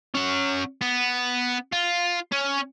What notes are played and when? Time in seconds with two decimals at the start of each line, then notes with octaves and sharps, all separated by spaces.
0.15 C#4 F#5
0.81 B3
1.72 F4
2.32 C#4